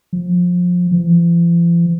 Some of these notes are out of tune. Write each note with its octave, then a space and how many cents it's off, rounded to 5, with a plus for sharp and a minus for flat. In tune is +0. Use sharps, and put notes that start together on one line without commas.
F3 +25
F3 -45